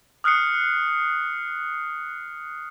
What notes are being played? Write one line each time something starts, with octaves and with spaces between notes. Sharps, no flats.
D#6 F6 F#6 C7 C#7